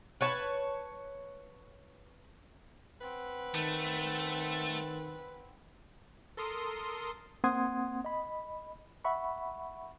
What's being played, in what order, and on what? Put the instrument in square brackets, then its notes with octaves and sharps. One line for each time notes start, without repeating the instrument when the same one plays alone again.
[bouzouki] B4 C#5 A5
[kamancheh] C4 F#5 [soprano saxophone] B4
[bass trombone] D#3 [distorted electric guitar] A3
[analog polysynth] A4 A#4 C6 D#6
[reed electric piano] A#3 C4 F#5 C6 D#6 G#6
D#5 B5
E5 F#5 B5 C#6